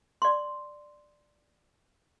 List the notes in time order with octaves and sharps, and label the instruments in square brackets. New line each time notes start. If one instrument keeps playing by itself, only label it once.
[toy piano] D5 C6